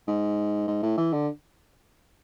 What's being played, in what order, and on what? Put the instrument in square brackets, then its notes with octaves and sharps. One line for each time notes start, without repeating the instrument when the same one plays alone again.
[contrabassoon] G#2
G#2
A2
E3
D3